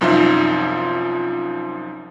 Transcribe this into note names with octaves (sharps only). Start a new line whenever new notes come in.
C2 F#2 F3 D#4 F4 E5